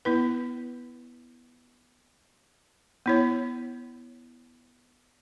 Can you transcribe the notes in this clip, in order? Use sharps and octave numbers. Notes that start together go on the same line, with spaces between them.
B3 E4 B4
B3 E4 C#5